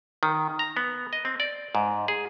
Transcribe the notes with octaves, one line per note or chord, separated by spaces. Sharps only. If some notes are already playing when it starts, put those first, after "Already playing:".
D#3
A#5
B3
D#5
C4
D5
G#2
G#4